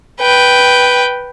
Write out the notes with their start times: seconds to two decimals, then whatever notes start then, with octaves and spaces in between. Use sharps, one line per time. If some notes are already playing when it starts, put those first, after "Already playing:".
0.21 B4 G5